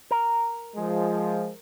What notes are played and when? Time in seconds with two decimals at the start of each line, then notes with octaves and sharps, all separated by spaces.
0.11 A#4
0.76 F3 G#3